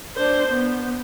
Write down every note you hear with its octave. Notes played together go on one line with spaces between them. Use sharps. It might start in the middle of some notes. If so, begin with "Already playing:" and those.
D4 C5
B3